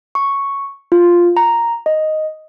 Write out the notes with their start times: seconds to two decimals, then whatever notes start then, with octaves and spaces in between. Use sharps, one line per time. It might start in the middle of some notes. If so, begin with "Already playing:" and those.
0.15 C#6
0.92 F4
1.37 A#5
1.86 D#5